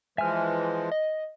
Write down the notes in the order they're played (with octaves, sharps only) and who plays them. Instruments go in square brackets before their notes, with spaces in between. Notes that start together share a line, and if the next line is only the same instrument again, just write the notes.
[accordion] E3 F3 G#3 [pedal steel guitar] E5 F6 [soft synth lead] G#5
[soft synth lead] D#5